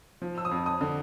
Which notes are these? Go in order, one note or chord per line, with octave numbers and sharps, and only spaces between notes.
F3
E6
D#6
F2
D#6
D3